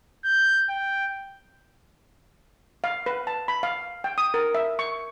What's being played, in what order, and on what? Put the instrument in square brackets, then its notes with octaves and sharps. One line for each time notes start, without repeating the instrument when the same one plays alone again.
[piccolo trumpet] G6
G5
[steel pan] F5
B4
A5
B5
F5
G5
D#6
A#4
E5
C#6